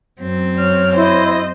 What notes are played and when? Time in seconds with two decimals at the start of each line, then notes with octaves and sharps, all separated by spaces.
0.21 F#2 C4
0.59 C#5 F6
0.96 E4 C5 D#5